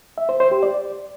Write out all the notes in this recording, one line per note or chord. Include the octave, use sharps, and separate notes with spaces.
E5
C5
C5
G4
D5